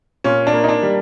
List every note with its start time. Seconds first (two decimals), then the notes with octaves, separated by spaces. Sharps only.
0.24 A#2 C#4
0.47 D4
0.53 A#3
0.64 D#4
0.68 D4
0.83 G3